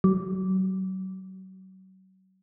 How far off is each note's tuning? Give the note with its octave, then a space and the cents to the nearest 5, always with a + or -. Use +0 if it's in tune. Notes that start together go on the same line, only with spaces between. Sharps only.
F#3 +35